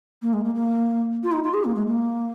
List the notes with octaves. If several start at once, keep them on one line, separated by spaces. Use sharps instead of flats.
A#3
G#3
A#3
A#3
F4
D#4
F4
G#4
A#3
G#3
A#3